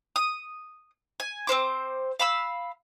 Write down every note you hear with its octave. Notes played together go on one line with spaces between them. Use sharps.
D#6
G#5
C4 A#4 C5 D6
F5 B5 E6